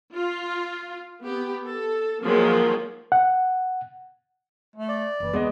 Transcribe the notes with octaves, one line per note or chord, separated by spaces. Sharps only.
F4
B3 G4
A4
D#3 F3 F#3 G#3 A#3
F#5
A3
D5
F#1 E3
E2 G#3 B3 D#5